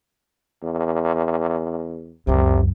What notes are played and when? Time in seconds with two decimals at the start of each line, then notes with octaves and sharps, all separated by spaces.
0.63 E2
2.27 C#2 F#2 C3